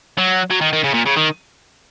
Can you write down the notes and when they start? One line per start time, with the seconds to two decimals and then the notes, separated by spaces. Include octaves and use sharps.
0.18 F#3
0.50 F#3
0.61 D#3
0.73 D#3
0.84 C#3
0.94 A#2
1.06 C#3
1.17 D#3